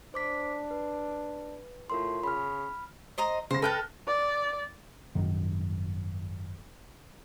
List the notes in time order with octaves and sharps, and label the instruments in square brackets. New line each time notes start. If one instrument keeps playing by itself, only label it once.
[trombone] D4 [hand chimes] C5 D6 B6
[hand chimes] B4
[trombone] A2 [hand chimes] F4 A#4 C6
[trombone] C#3 [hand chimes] B5 F6
[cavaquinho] C5 D#5 A#5
[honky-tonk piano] C#3 A#6 [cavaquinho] C5
[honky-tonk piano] A4 F6 F#6 [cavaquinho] B4 G5 A5
[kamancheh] D5
[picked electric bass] G#1 F#2 D#3